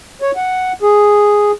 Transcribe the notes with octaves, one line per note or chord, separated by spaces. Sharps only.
C#5
F#5
G#4